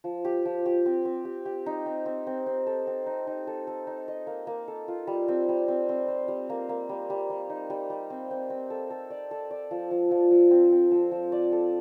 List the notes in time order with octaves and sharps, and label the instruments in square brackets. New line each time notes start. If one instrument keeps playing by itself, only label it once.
[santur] F3
G4
F3
G4
C4
C4
G4
G4
D#4
C4
C4
C4
C4
A4
C4
D#4
D#4
A4
A4
D#4
D#5
A#3
A#3
A4
F4
G3
C4
G3
C4
C4
C5
G3
A#3
A#3
G3
G3
G3
D#4
G3
G3
C4
C4
C4
A4
A4
D5
A4
D5
F3
F3
F3
F3
C4
C4
F3
F3
D5
A4